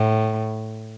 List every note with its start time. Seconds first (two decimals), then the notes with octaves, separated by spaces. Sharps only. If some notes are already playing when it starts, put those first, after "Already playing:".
Already playing: A2